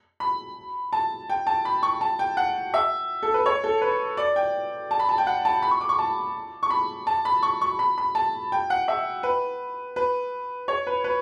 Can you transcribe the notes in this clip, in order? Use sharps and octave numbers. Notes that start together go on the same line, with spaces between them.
B5
A5
G5
A5
B5
C#6
A5
G5
F#5
E5
A4
B4
C#5
A4
B4
D5
G5
A5
B5
A5
G5
F#5
A5
B5
C#6
D6
C#6
A5
C#6
B5
A5
B5
C#6
C#6
B5
B5
A5
G5
F#5
E5
B4
B4
C#5
B4
B4